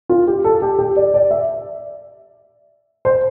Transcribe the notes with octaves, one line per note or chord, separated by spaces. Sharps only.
F4
G4
A4
G4
G4
D5
D5
E5
C5